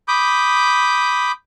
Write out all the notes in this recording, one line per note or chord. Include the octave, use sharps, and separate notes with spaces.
B5 D6 D#6 G6